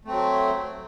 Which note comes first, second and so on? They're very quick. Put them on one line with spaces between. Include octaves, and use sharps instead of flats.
A3 C4 F#3